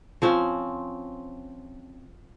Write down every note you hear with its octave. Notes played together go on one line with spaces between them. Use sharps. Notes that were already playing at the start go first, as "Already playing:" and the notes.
F3 C4 C#4